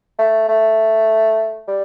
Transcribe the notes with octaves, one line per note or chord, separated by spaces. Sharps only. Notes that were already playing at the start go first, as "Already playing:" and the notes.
A3
A3
G3